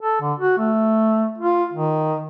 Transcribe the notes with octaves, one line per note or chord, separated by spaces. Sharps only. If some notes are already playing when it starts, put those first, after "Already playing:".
A4
D3
F#4
A3
F4
D#3